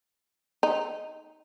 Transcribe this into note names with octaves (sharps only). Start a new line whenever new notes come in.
D#4